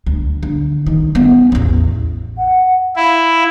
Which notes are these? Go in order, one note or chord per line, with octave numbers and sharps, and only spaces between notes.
D2
D3
D#3
B3 C#4
A1 E2
F#5
E4 F5